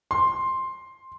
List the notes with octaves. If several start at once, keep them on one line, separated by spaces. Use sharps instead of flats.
C6